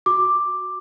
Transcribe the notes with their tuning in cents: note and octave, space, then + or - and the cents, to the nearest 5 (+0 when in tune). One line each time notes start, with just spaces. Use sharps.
F#4 +0 D6 +5